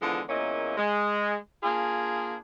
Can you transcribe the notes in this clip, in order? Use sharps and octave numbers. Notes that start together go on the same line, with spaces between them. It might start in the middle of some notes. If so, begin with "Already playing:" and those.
D3 E3 F3 G#3 B3 D4
E2 A#2 A#3 C#4 E4 D#5
G#3
A#3 D4 F4 G#4